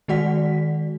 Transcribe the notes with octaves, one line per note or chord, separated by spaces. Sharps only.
D#3 G#3 F#4 D5 F#5 B6